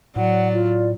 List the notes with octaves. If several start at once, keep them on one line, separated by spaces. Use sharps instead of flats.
A2 F#3 D5 F#5
F4